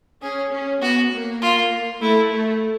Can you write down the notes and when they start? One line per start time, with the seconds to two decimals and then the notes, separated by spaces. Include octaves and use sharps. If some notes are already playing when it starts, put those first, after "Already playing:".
0.22 C#4 G#4
0.51 C#4
0.82 B3 F#4
1.12 A#3
1.42 F4
2.01 A3 E4
2.31 A3